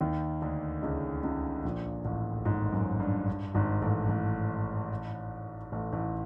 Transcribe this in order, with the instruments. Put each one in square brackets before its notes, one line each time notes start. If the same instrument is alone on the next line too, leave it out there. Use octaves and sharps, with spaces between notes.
[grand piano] D#2 D#3
D2 D3
C#2 C#3
C#2 C#3
A#1 A#2
A1 A2
G#1 G#2
F#2
G2
G2
G#1 G#2
A1 A2
A1 A2
A1 A2
A1 A2